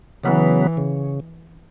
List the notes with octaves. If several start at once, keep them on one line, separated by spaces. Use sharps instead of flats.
C#3 E3 F#3 B3
C#3